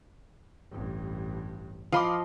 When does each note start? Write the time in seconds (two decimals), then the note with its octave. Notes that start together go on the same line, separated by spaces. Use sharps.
0.71 A1 G2
1.92 F3 D#5 F5 B5 C6 D6